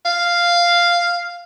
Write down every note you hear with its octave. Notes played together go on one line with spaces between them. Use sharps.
F5